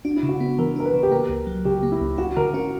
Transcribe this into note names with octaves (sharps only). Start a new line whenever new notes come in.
D4 F#4
E4
C#3
F#4
B3
E3 A#4
D4 A#4
B4
C#3
G4
A#3 A#4
C#2
F#3
C#3 G4
A#3
E4
C#2
E4 F#4
D3 A#4
C#4 F#4